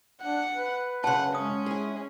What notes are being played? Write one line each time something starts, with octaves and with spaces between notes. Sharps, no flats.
D4 F#5
B4
F#2 C#3 F#5 A5 C6
G#3 C#4 D#6
E4 G#4